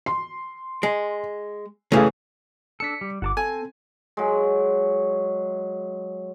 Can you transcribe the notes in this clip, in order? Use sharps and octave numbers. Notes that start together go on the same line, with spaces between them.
C6
G#3
C#3 E3 A3 G#4 F5
D4 A4 B6 C#7
G3
G1 F#5 A5 D6
C4 A4 G#5
F#3 G#3